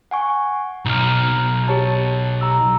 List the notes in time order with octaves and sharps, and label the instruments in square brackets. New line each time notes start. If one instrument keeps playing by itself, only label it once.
[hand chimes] F#5 G#5 C#6
[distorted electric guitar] B1 [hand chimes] A#5 F6
[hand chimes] G4 C#5 A5
A#5 E6